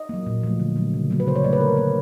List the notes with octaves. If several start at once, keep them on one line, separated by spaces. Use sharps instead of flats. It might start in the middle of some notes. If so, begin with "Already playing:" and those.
Already playing: D#5
F#3 A#3
A#2
F3 A3
D3
F#3 A3
C#3
F#3 A#3
B4
C#3 C5
C#5
F#3 A3 D5
B4
D3 A#4
F#3 A#3